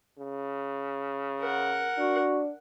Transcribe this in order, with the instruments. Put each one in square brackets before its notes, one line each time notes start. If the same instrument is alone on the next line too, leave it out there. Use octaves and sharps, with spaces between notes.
[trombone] C#3
[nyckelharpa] A#4 F#5
[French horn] D4 [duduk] F#4